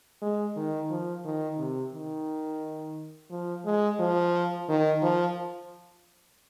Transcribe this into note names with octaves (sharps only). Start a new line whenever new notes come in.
G#3
D#3
F3
D#3
C3
D#3
F3
G#3
F3
D#3
F3